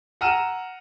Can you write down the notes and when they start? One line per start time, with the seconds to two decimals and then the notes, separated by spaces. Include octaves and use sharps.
0.21 F#5 A#5 E6 F6 D#7 E7